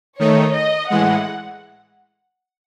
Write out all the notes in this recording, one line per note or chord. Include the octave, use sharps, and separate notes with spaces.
D#3 A3 D#4 C#5
D#5
A2 E3 G#3 F#5